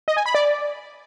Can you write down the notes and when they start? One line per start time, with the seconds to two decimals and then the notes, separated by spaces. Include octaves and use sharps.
0.08 D#5
0.17 G#5
0.26 B5
0.35 D5